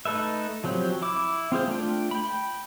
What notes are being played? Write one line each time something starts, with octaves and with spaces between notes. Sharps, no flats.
A3 D#4 A4 B4 E5
F3 F#3 C4 G4
E4 D6
C4 F4 G#4 C5
A3 D4 F4 G5
G5 B5